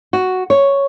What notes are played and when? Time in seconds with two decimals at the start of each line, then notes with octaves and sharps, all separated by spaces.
0.13 F#4
0.50 C#5